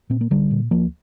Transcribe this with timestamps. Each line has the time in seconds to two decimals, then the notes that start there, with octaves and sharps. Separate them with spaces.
0.10 A#2 C4
0.21 A#3
0.30 C2 D3 G3
0.51 A#2
0.71 D2 F3 A#3